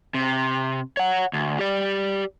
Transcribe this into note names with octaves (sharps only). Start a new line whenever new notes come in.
C3
C#5 F#5
D2
G4 D5